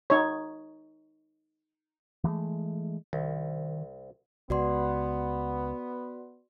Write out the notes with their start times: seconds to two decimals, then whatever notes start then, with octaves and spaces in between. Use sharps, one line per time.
0.10 D#4 C#5
2.24 E3 F#3 G#3 A3
3.13 C2 D#3
4.50 C#2 B3 F#4 D5 C6